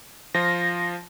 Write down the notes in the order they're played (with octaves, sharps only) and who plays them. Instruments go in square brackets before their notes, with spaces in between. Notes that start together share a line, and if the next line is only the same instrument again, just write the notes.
[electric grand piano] F3 F4 F5 [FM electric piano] A#6